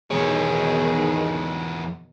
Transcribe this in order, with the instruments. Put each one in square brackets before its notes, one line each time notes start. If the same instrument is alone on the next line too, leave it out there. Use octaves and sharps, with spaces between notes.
[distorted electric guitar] E2 C#5 [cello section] B2 D#3 [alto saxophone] G#4